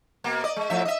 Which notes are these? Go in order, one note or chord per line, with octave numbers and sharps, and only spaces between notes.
B2 A#3
D5 D#5
G#3
A2 F3 E5
D#5 E5